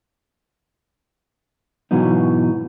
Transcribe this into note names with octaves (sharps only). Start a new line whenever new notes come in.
G#2 B2 E3 F#3 B3 D#4